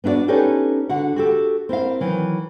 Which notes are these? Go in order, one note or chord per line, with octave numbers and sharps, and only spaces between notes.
B3 D4 E4 F#4 D5
C#4 D#4 G4 A4 B4 C#5
D3 F#4 F#5
F#4 G4 A4
C4 E4 A#4 F5
D#3 E3 F#3